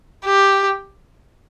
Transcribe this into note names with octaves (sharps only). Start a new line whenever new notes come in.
G4